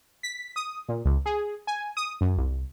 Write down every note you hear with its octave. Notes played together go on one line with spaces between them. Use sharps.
B6
D#6
A#2
C#2
G#4
G#5
D#6
F#2
C2